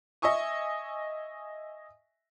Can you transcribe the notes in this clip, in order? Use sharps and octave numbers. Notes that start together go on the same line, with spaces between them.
D#5 E5 G#5 C#6 D#6